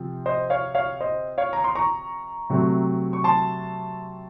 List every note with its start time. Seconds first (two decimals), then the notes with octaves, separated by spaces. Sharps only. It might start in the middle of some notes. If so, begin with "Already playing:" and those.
Already playing: C3 F3 C4
0.26 C5 D#5
0.50 C#5 F5
0.75 C#5 F5
1.01 C5 D#5
1.38 C#5 F5
1.53 A#5
1.64 C6
1.75 A#5 C#6
2.50 C3 F#3 A3 C4
3.13 C#6
3.24 A5 C6